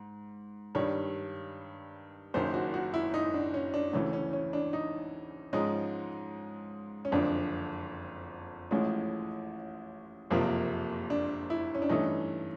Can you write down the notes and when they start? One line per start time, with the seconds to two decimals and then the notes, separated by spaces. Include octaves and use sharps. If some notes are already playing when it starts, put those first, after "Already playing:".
Already playing: G#2
0.75 G2 D#3 G3 C#5
2.34 F#1 F#2 D#3 C5
2.54 F#4
2.74 F#4
2.94 E4
3.14 D#4
3.34 D4
3.54 C#4
3.74 D4
3.93 D2 C#3 E3 A3 C#4
4.13 C#4
4.33 C#4
4.53 D4
4.73 D#4
5.53 G#2 F3 G#3 C#4 D#4
7.05 C#4
7.12 F#1 F2 D3 F3 D4
8.71 A1 A2 F3 G#3 C#4
10.30 F#1 F2 C3 F3 A#3
11.10 D4
11.50 E4
11.74 C#4
11.82 D4
11.89 G2 E3 A3 C#4 D#4